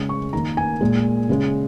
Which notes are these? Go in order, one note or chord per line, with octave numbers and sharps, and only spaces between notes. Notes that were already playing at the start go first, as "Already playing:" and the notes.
Already playing: C#3 G#3
C#6
D#3 A#3 A#5
G#5
A#2 G#3
C#3 G#3